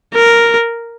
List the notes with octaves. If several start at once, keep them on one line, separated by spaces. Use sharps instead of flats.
A#4